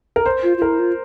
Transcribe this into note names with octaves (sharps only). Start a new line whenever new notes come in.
A#4
C5
F4
F4
E4 A#4
F4